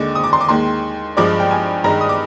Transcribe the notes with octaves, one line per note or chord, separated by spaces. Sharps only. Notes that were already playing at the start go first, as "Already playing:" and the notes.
Already playing: D#2 D3 G#3 D6
D#6
D6
C6
D6
D#2 D#3 G#3 C6
G2 F3 G#3 D6
G5
G#5
G2 D#3 G#3 A#5
D#6
D6